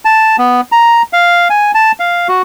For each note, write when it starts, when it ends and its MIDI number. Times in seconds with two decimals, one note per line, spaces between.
0.05 0.36 81
0.38 0.61 59
0.72 1.02 82
1.13 1.48 77
1.50 1.71 80
1.74 1.92 81
2.00 2.28 77
2.28 2.42 66